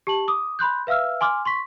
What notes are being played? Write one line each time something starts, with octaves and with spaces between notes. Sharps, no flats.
G4 A5 F#7
D6 D#6
B5 C6 F#6 G6
B4 E5 F5 E6 F6
G#5 C6 D6 F6
C6 C#6 B6